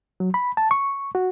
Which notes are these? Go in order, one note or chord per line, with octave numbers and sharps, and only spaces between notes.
F#3
B5
A5
C#6
F#4